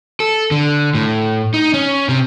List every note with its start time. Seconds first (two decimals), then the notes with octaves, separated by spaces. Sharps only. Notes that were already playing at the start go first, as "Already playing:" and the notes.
0.20 A4
0.51 D3
0.95 A2
1.54 D#4
1.74 C#4
2.09 C3